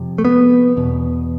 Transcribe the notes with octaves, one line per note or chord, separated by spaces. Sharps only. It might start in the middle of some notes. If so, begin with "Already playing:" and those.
Already playing: F2 C3
A3
B3
E2 B2